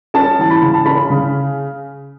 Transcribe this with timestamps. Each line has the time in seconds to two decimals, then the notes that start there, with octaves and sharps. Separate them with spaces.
0.14 C#4 A5
0.39 E3 A5
0.50 B5
0.62 C#3
0.74 A5
0.86 C#4 B5
1.10 C#3